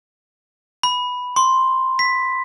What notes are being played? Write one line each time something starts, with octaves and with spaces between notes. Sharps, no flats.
B5
C6
B6